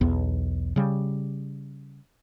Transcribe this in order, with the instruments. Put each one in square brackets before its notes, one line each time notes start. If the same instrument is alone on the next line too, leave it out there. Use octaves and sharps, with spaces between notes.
[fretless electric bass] B1 E2 B3
C#3 G3